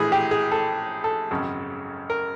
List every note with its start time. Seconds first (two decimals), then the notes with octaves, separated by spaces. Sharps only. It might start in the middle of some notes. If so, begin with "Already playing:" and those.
Already playing: A#1 A2 E3 G#4
0.12 G4
0.31 G#4
0.52 A4
1.04 A4
1.31 G#1 F#2 C#3
2.10 A#4